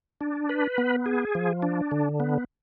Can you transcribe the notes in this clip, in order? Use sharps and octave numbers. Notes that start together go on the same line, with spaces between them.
D4
B4
B3
G#4
F3
D4
D3
B3